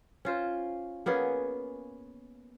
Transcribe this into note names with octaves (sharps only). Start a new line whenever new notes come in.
C#4 F4 C5
A#3 B3 C#4 G#4